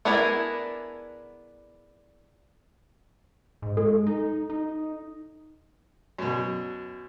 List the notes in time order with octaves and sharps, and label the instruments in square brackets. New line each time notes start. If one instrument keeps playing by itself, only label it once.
[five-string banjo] B3 D4 E4 G#4 A#4
[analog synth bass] G#2
[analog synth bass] G#3 [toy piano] A4
[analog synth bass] D#4
D#4
[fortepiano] F#2 B2